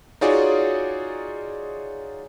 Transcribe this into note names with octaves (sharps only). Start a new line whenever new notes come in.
D#4 F4 F#4 G#4 C#5 D5